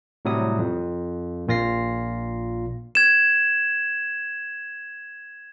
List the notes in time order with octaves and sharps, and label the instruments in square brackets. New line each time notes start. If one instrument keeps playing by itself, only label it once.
[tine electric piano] A2 C3 F#3 G3 D#6
F2
A#1 A#2 F4 A#6 C7
[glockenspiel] G#6 E7